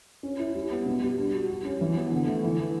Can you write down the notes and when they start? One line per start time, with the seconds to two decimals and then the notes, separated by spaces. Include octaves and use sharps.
0.23 C#4
0.39 E4
0.54 G3
0.71 B3
0.86 B2
1.02 G3
1.18 D4
1.34 F#4
1.50 G3
1.65 C#4
1.81 E3
1.96 B3
2.12 D3
2.27 A3
2.43 E3